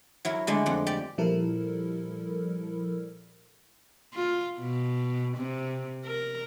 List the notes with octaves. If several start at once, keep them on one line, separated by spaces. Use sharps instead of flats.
F#3 E4 A#4
D3 G#3 A3 D4
F2 F#5
G4 D5
A#2 F3 G3 E4 A4 A#4
F4
B2
C3
A#4